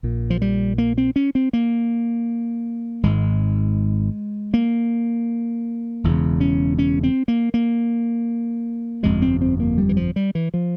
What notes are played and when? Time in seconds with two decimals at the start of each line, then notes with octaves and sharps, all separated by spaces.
0.03 A#1 A#2
0.30 F3
0.42 G3
0.78 A#3
0.98 C4
1.16 C#4
1.35 C4
1.53 A#3
3.03 G#1 G#2 G#3
4.54 A#3
6.04 E1 E2 C#3
6.40 C#4
6.79 C#4
7.03 C4
7.28 A#3
7.54 A#3
9.03 G1 F2 C3 G#3
9.22 C4
9.41 C4
9.60 A#3
9.78 G3
9.89 E3
9.97 F3
10.16 G3
10.35 E3
10.54 F3